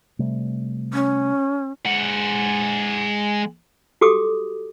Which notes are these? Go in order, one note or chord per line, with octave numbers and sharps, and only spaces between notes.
C3 G3 A3
C#4
G#3 F#5
F#4 G4 A4 D6 D#6